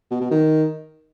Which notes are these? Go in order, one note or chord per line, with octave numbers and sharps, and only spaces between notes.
B2
B2
D#3